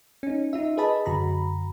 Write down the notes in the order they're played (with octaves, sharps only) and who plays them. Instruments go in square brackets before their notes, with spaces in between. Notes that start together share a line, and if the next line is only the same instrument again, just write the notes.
[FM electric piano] C#4 D#4
D#4 F4 E5
G#4 B4 D#5 A5 B5
F#2 D3 F#4 A#5 B5